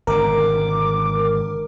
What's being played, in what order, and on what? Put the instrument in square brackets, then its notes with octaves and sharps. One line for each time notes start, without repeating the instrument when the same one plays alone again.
[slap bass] G#1 B2 D3 [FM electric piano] A#4 [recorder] D6